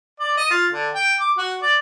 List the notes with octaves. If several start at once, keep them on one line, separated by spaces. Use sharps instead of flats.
D5
D#5
F4
D3
G5
D6
F#4
D5